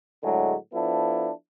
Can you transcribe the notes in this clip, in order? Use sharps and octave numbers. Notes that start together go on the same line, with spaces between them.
A2 D3 F#3 G#3
F3 B3 D4 E4 A4